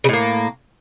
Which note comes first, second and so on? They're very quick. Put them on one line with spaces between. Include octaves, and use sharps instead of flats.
C#3 A2 A#3